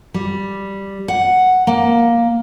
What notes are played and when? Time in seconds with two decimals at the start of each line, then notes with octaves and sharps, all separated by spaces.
0.14 G3
1.08 F#5
1.67 A#3